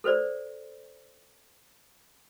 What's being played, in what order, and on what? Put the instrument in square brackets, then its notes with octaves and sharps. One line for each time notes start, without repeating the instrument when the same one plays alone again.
[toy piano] A4 B4 C5 D5